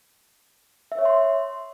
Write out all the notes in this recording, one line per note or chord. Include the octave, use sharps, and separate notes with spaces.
E5
C#5
C6